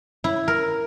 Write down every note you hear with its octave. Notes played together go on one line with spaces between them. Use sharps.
E4
A#4